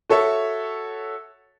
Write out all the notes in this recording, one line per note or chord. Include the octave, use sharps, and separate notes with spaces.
F#4 A4 C#5 E5